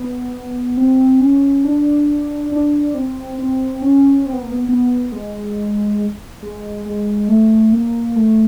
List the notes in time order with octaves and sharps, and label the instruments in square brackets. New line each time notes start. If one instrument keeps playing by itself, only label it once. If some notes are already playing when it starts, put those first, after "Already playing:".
Already playing: [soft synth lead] B3
C4
C#4
D4
D4
C4
C4
C#4
C4
B3
A#3
B3
B3
G#3
G#3
G#3
A3
A#3
A3